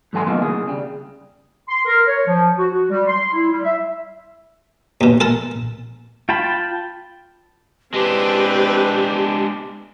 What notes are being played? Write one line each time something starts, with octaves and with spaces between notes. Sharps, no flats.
G#2 F#3 A4 G#5 C6
B2 D#3 F#3 A3 A#3
C2 F2 G#4
C#3 G3
C6
A#4
C#5
F3
F#4
F#4
G3
C6
E4
G3
E5
D#2 B2
A4 A#4 A5
F4 G5 A5 B5
G#3 C4 D4 G4 B4